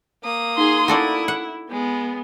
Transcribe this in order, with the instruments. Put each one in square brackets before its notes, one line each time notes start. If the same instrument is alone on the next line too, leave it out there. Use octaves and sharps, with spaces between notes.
[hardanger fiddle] A#3 D#6
[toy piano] D#4 F4 F#5 [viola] G#4 C6
[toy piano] C#4 D6 [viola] E4 [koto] F#4 A4 D5
[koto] F#5
[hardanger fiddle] G#3 [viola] B3